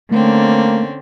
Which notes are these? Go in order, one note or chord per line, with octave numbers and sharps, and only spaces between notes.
D3 A3 A#3 C4 C#4